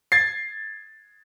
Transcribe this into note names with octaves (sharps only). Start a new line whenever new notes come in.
G#6 A6 C7